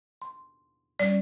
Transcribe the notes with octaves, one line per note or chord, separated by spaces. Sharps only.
C6
G3 C#4 D5